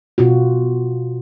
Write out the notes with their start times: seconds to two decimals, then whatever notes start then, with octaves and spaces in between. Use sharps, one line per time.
0.18 B2 F4 F#4